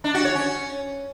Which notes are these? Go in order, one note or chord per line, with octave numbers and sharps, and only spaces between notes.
D4
F#4
C#5
C#4